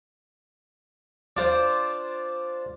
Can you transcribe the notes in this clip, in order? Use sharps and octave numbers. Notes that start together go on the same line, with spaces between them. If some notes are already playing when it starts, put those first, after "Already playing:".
D4 F4 C5